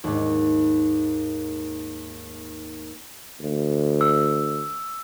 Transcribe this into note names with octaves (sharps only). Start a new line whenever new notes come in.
D#2 G#2
D2
E6